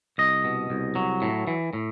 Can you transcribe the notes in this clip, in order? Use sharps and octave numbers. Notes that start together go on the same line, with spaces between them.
C2 D#5
B2
C2
F#3
A2
E3
A2